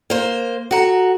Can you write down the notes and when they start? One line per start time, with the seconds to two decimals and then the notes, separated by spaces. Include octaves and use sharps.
0.10 A#3 C5
0.71 F#4 A4 F#5 A#5